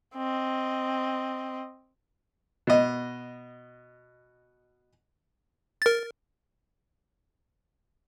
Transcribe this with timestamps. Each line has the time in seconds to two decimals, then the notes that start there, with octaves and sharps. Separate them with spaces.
0.15 C4 D#5
2.67 B2 D#5
5.82 A#4 A6